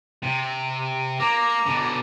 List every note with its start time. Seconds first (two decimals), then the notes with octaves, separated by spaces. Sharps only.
0.23 C3
1.20 A#3 A#5 D6
1.67 B2 D3